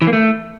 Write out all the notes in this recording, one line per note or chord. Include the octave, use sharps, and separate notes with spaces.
E3
A#3
A3